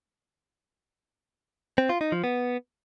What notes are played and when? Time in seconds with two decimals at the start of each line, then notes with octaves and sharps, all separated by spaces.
1.78 C4
1.89 F4
2.01 D#4
2.12 F3
2.24 B3